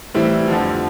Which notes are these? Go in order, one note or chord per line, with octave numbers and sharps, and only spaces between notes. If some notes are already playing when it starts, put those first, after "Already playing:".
A2 E3 G3 C4 E4
F2 D3 F3